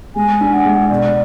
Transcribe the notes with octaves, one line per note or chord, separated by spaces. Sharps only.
G#3 G#5
D4
F#5
G#3
B2 D5